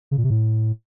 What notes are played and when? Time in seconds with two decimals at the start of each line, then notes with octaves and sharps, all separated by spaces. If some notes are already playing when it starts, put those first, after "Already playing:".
0.11 C#3
0.18 A#2
0.24 C3
0.30 A2